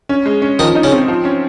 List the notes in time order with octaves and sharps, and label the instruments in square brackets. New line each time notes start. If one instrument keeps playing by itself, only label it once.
[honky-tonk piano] C#4
G#3
C#4
[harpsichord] D#3 D#4 [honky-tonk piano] F3
[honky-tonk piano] D#4
[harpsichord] C#3 C#4
[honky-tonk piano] C4
F3
C#4